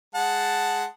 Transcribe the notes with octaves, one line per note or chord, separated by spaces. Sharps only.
G#3 F#5 A5